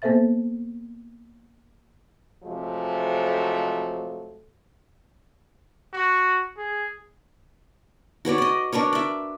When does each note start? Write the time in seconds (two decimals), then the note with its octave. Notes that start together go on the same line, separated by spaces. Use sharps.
0.02 A#3 B3 A4 C5 E5 A6
2.44 C3 F3 F#3 G#3 A3
5.94 F#4
6.57 G#4
8.25 F#4 B4 C#5 D5
8.38 D5 D#5
8.72 D4 A#4 B4 C#5
8.93 D5 E5